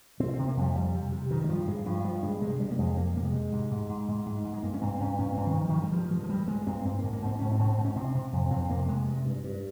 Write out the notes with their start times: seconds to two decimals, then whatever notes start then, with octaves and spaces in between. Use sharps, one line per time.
0.20 C3 C4
0.33 C3 C4
0.47 A#3
0.57 F2 G3
0.75 F2 G3
0.94 C3
1.12 C3
1.31 G2 D#3
1.44 G3
1.48 G2 F3
1.67 G2 G#3
1.86 G2 F3
2.04 G2 F3
2.22 G2 G#3
2.42 C3 G#3
2.60 C3 G3
2.71 A#3
2.78 F2 G#3
2.97 F2 A#3
3.15 C3 A#3
3.25 G#3
3.33 C3
3.52 G#2
3.71 G#2
3.89 G#2
4.08 G#2
4.26 G#2
4.44 G#2
4.53 G#3
4.63 G2 A#3
4.74 C#4
4.81 G2 C4
5.00 G2 C#4
5.19 G2 C#4
5.32 G2 C4
5.47 D#3
5.56 G2
5.61 F3
5.68 D#3
5.73 G2 F3
5.84 G3
5.92 G2 F3
6.11 G2 F3
6.23 F3
6.29 G2 G3
6.48 G2 G#3
6.67 G2 C4
6.85 G#2 C4
6.99 G#2 A#3
7.13 A#3
7.22 G#2 C4
7.39 G#2 C#4
7.52 C4
7.59 G#2
7.77 G#2
7.85 C#4
7.96 C3 C4
8.14 C3
8.33 F2
8.51 F2 C4
8.70 C3 A#3
8.88 C3 G#3
9.07 G2
9.25 G2
9.43 G2